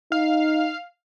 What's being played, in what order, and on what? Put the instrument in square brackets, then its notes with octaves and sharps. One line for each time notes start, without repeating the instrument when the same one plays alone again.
[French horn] D#4 [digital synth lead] F5